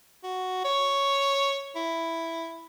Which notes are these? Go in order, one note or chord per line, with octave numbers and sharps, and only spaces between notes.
F#4
C#5
E4